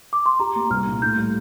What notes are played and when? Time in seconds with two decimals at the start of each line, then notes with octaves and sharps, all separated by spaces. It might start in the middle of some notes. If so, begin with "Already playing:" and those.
0.13 D6
0.26 C6
0.39 G4 A#5
0.56 A#3
0.70 C2 F6
0.87 A#2
1.02 A2 G6
1.18 G3